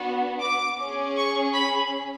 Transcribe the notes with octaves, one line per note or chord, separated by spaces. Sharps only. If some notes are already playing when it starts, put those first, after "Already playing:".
Already playing: B3 D4 F#4
D6
C#4 G#4
C#6
B5